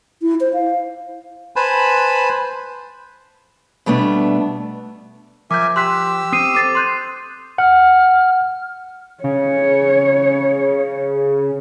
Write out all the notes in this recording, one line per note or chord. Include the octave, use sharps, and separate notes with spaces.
E4
C5
F5
B4 C5 G#5 A5 B5
B2 G3 A3 B3 D4
F3 A#4 E5 G#5 D6 G6
G4 C6 E6 F#6 B6
C4 D#6 C7 D#7
A4 C5 D6 A6 C7 D#7
C6 F#6 G6
F#5 F6
C#3 C#5